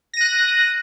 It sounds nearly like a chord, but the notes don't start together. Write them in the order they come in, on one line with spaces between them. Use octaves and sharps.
A#6 D#7 F#6